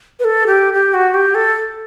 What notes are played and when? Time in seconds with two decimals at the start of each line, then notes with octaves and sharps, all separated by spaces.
0.20 B4
0.24 A4
0.47 G4
0.74 G4
0.94 F#4
1.14 G4
1.35 A4